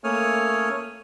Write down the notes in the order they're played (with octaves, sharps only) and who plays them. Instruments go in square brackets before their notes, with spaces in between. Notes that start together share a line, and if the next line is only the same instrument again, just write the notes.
[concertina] A3 A#3 C#4 C#5 D#6 F6